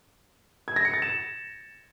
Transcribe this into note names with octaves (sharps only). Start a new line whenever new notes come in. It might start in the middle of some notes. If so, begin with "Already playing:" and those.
G#6
A#6
C#7
A6
E7